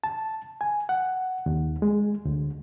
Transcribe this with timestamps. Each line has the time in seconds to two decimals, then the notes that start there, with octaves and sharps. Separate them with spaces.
0.04 A5
0.61 G#5
0.89 F#5
1.46 D#2
1.82 G#3
2.25 D2